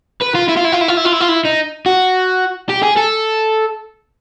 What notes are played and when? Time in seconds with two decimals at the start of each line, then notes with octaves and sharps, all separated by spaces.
0.21 B4
0.35 F4
0.48 E4
0.57 F4
0.64 E4
0.72 F4
0.81 E4
0.88 F4
0.97 E4
1.05 F4
1.13 E4
1.21 F4
1.29 E4
1.45 D#4
1.86 F#4
2.69 G4
2.83 G#4
2.97 A4